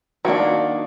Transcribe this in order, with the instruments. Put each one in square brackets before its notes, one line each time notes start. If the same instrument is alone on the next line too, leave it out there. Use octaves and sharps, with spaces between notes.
[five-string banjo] D#3 G3 A#3 D4 F#4